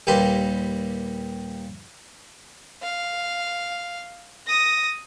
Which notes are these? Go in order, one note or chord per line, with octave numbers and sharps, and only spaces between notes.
D#2 A#2 G3 G4 B4 C6
F5
D#6 A#6